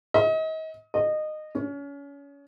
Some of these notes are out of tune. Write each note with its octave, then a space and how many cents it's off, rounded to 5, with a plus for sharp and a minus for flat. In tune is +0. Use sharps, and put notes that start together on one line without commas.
D#5 +35
D#5 -20
C#4 +30